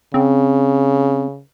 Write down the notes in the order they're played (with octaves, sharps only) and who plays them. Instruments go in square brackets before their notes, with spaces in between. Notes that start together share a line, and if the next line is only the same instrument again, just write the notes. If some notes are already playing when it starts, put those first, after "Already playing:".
[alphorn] C#3 [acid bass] C4